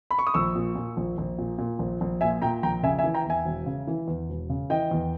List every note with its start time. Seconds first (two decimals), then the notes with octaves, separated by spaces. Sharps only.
0.11 B5
0.19 C#6
0.27 D#6
0.34 A#1 C#6 E6
0.55 A#2
0.75 A#2
0.97 A#1
1.18 A#1
1.38 A#2
1.58 A#2
1.79 A#1
2.01 A#1
2.21 A#2 E5 G#5
2.42 A#2 G5 A#5
2.63 A#1 G5 A#5
2.83 C#3 E5 G#5
2.99 E5 G#5
3.04 E3
3.14 G5 A#5
3.25 E2 E5 G#5
3.45 E1
3.66 C#3
3.87 E3
4.08 E2
4.29 E1
4.50 C#3
4.70 E3 D#5 G5
4.91 E2